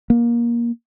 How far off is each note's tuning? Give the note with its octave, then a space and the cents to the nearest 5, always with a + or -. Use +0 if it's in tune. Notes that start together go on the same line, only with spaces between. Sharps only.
A#3 +20